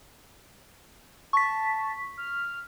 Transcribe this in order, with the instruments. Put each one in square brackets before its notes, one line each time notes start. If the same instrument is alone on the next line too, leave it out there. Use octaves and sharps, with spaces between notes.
[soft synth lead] A5 [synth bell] C#6 B6
[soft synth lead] F6